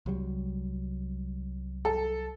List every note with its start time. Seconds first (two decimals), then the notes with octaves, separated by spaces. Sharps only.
0.06 C2 F#3 G3
1.85 A4